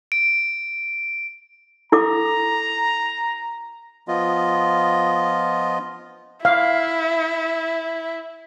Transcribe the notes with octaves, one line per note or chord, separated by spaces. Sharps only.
D7
E4 A4 A#5 D6
F3 B3 F4 D#5
E4 F5